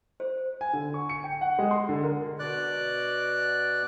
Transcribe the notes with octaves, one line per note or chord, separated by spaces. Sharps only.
C5
G#5
D3
C#6
C#7
G5
F#5
G#3
C6
D3
A#4
B2 D5 F#6